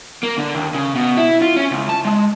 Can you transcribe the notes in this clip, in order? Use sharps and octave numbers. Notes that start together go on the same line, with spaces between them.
A#3
D3
D#2
C#3
B2
E4
F4
C#4
C#2
A5
G#3